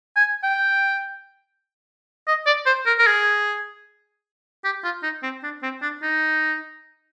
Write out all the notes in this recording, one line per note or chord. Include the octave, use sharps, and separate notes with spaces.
G#5
G5
D#5
D5
C5
A#4
A#4
G#4
G4
F4
D#4
C4
D4
C4
D4
D#4